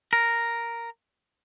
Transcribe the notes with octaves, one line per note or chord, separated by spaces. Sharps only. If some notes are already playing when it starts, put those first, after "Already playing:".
A#4